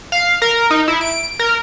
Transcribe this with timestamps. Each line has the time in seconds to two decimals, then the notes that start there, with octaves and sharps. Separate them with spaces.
0.12 F5
0.42 A#4
0.71 D#4
0.88 E4
1.01 D7
1.39 A#4